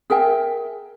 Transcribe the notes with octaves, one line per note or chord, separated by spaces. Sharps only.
G#4 A#4 E5 G5